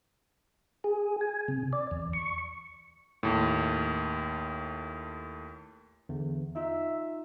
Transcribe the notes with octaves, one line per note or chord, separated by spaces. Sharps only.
G#4
G#5
C3
D5
E2
C#6
D#2 A2
E2 D3
D#4 F4 E5